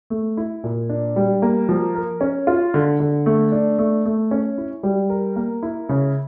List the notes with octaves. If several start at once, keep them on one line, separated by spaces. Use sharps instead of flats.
A3
E4
A#2
D4
G3
A#3
F3
A#4
C#4
F4
D3
D3
A3
D4
A3
A3
C#4
E4
G3
A#4
A#3
E4
C#3